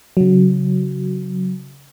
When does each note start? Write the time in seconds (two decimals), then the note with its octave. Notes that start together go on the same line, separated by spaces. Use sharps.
0.17 C#3 F#3